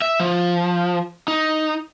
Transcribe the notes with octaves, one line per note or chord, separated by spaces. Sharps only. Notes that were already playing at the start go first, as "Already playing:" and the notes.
E5
F3
D#4